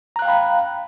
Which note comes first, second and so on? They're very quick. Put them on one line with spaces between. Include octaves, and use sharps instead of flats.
A#5 F#6 F5 G5 B5